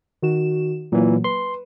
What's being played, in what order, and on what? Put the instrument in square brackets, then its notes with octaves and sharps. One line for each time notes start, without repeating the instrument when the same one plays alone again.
[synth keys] D#3 F#4 E7
[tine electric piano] A#2 E3 [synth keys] F#3 A#3
[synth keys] B4 [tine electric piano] C6